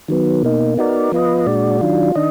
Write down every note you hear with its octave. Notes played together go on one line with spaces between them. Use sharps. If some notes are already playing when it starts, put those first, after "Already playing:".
D#3 F#3 B3
B2 A#3 D#4
B3 D#4 F#4 A#4 D5
F3 B3 F4 B4 D#5
A#2 G#3 D4 F#4 D5
D#3 F#3 D4 F4
D#3 D4 D#5